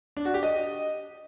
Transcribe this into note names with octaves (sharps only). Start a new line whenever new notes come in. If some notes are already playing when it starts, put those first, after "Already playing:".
D4
F#4
G4
D#5